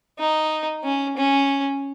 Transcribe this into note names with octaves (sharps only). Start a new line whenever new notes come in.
D#4
C#4
C#4